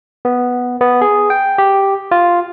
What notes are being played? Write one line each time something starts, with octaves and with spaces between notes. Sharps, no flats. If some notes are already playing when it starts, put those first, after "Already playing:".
B3
B3
G#4
G5
G4
F4